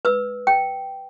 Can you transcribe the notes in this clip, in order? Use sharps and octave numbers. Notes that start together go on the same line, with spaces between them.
B4 E6
G5